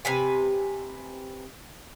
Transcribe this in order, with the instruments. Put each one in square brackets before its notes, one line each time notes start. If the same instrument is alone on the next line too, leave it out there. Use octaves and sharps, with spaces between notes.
[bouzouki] C3 B4 G#5